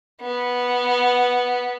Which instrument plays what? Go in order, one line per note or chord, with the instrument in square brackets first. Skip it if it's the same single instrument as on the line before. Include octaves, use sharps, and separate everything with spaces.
[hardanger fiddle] B3